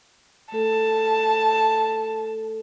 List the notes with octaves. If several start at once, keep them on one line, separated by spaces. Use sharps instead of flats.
A3 A4 A5